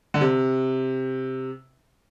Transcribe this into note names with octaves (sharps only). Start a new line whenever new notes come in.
D3
C3